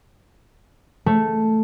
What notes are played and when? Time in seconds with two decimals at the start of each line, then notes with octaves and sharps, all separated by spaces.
1.06 A3